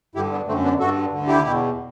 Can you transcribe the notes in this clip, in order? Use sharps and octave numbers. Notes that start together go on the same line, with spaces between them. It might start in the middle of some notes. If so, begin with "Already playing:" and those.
G2 D3 E4 G4
B3 D4
F#2 D3 A3 C4
B3 D4
G2 D3 F#4 A4
D2 D3
E4 G4
E2 B2